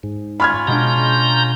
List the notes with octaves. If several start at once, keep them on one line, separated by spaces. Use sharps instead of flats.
G#2
C#4 F4 B5 F6 G#6
B2 G#3 D4 A#5 G6